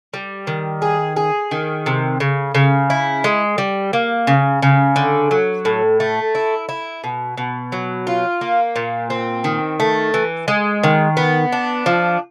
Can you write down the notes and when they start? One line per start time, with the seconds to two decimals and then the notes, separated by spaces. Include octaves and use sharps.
0.14 G3
0.47 D#3
0.82 G#4
1.16 G#4
1.51 D#3
1.86 C3
2.20 C#3
2.55 C#3
2.90 E4
3.24 G#3
3.58 G3
3.93 A#3
4.27 C#3
4.62 C#3
4.96 D3
5.31 F#3
5.65 A2
6.00 A3
6.35 E4
6.69 E4
7.04 B2
7.37 B2
7.72 F#3
8.07 F4
8.41 A#3
8.76 A#2
9.10 C4
9.44 D#3
9.80 A3
10.14 E3
10.48 G#3
10.83 D#3
11.17 B3
11.52 D4
11.86 F3